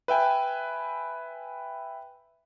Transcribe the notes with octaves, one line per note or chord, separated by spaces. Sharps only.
B4 E5 G5 G#5